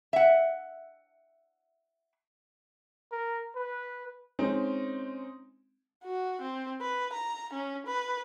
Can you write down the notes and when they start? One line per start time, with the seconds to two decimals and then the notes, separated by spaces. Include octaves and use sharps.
0.13 E5 F#5
3.12 A#4
3.55 B4
4.39 G#3 C4 C#4 D#4
6.04 F#4
6.41 C4
6.81 B4
7.13 A#5
7.53 C#4
7.86 B4